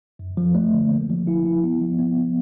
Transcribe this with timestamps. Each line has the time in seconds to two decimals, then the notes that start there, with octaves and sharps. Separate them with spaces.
0.19 F#2
0.37 F3
0.55 A3
0.74 D3
0.90 A#3
1.10 F3
1.27 E4
1.46 E4
1.64 B3
1.82 F3
1.99 B3